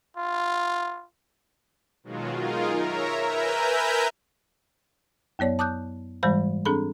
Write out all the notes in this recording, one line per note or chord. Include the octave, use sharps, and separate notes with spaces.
F4
B2 D#3 F#3 G#3 F4 F#4
D#4 F4 G#4 A#4
A#4 C#5 E5 A#5
A#4 B4 E5 G#5 A#5 G6
F#2 F#3 B3 C#5 D5
A5 D6 D#6 F#6 G6
G#2 E3 G3 G#3 C5 B5
C4 D4 G#4 A4 B5